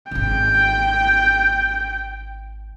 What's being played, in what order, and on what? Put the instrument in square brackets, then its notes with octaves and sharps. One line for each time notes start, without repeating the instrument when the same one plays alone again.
[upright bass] D#1 G#1 [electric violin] G5